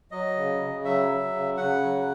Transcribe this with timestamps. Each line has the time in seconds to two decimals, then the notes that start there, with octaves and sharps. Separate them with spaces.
0.11 F#3 D#5
0.36 C#3
0.60 C#3
0.84 F#3 E5
1.08 F#3
1.33 C#3
1.57 C#3 F#5
1.82 F#3